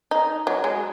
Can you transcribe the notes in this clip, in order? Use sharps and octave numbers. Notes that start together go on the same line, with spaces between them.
D#4
F#3
G#3